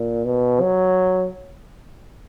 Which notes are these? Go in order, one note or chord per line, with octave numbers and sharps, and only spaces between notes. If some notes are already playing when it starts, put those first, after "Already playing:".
Already playing: A#2
B2
F#3